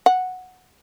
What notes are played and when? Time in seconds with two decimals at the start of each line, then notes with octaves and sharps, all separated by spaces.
0.06 F#5